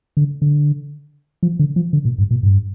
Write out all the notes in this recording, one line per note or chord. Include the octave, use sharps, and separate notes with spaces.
D3
D3
F3
D3
F3
D3
A#2
G2
A#2
G2